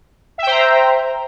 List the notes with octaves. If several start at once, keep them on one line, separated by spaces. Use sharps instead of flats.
C5 E5 G5 A#5